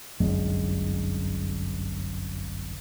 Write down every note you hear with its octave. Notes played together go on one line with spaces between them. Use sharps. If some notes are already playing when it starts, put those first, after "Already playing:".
G1 C2 F#2 G#3